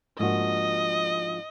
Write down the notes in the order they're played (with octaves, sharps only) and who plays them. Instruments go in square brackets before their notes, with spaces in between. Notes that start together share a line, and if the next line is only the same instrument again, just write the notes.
[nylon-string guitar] G#2 F3 A#3 D4 F#4 [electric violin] D#5